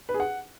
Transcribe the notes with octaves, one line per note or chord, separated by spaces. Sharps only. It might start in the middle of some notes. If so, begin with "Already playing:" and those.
B4
G#4
F#5